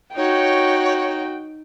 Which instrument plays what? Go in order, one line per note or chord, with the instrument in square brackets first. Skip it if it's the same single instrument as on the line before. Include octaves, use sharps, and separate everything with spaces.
[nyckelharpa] D#4 [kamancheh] F#4 G5 [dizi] C#5